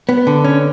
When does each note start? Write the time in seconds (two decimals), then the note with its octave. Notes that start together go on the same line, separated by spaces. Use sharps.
0.09 B3
0.27 D3
0.45 C#4